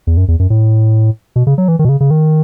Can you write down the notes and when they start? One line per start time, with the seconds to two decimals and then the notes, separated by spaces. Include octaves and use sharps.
0.07 E2
0.17 F#2
0.28 E2
0.39 F#2
0.50 A2
1.36 B2
1.47 C#3
1.58 F#3
1.68 E3
1.79 D#3
1.85 B2
1.89 C#3
2.00 C#3
2.11 D#3